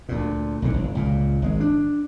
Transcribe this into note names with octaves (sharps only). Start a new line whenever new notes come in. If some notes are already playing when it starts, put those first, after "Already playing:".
D2 A#2
B1 G#2 D3
G1
C#2 A#2
G#1 G#3
D4